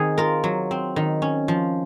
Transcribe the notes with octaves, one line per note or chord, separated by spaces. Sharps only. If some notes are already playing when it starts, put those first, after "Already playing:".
Already playing: D#3 C4 G#4
F4 A#4
F#3
C4
D#3
C#4
F3